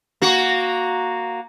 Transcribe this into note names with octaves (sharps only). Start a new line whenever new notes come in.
A#3 F#4